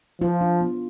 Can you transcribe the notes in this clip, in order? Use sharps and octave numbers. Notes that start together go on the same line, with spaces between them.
F3 F4
D4
B3